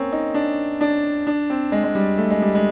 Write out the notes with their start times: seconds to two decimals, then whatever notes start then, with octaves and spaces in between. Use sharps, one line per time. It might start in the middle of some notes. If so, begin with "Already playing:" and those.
Already playing: A#3 C4 C#4
0.13 D#4
0.34 D4
0.81 D4
1.27 D4
1.50 C4
1.72 G#3
1.84 G#3
1.95 G3
2.18 A3
2.30 G#3
2.42 G3
2.55 G#3